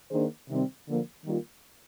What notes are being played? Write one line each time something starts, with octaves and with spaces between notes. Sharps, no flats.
D#3 A#3 D4 G#4 C5
C3 D#3 G3 C4
D3 F3 A#3
D#3 G3 A#3 F4